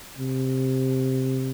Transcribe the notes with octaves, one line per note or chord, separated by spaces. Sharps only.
C3